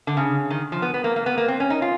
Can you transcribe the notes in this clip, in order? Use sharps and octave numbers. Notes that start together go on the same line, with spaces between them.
D3
C#3
D#3
F3
B3
B3
A#3
A#3
B3
A#3
C4
C#4
D#4
F4